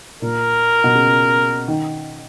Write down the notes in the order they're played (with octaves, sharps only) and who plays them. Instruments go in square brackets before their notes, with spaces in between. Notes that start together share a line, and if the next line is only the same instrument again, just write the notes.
[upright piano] A#2 [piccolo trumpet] A#4
[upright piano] B2
C#3
D#3